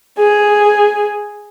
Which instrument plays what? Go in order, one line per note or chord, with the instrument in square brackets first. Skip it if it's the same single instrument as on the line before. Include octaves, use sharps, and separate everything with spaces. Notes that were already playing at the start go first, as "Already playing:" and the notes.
[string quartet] G#4